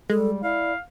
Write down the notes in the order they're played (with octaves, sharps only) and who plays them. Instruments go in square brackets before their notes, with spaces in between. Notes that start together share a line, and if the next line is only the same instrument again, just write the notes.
[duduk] G3 [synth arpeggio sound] G#3 [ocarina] A4
[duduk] E4 [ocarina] D5 [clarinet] F5